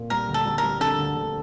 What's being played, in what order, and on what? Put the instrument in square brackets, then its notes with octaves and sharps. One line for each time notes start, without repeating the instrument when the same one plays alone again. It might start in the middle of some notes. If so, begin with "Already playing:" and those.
Already playing: [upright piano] A#2
[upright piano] G3 [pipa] A#4
[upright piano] D2
[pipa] A4
[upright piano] G3
[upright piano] G3 [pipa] A#4
[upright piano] D3 [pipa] A4
[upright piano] D2
D2